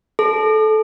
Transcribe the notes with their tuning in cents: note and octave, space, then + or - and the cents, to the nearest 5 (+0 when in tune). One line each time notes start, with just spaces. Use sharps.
A4 -20